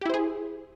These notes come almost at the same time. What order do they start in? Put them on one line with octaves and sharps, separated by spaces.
G4 E4 C5 G#4